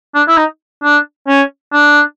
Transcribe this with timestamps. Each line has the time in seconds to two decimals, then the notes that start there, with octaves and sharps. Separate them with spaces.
0.15 D4
0.28 E4
0.38 D#4
0.83 D4
1.28 C#4
1.73 D4